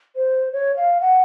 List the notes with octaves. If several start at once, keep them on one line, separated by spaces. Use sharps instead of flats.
C5
C#5
F5
F#5